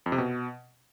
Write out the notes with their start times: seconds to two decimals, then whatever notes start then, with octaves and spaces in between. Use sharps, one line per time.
0.06 F2
0.12 C3
0.18 B2